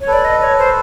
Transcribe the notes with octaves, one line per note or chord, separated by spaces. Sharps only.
C#5
A4 B4
D5
D#5
C#5
C5